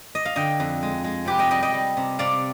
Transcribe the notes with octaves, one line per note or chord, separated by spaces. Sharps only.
D#5
F5
D3 D#5 G5
F2
G#3
G#3
C3 G4 B4
D#5 G5
G3 D#5 G5
D#5 G5
G3
C3
C3 D5 F5